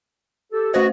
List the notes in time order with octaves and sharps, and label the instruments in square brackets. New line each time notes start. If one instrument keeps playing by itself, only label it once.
[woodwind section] G4 A4
[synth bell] A3 C5 [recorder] F#4 [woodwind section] B4 D#5